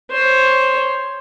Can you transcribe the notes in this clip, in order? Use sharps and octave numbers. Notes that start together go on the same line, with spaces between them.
C5 C#5